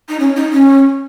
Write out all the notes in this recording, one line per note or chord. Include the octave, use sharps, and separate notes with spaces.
D#4
C#4
D#4
C#4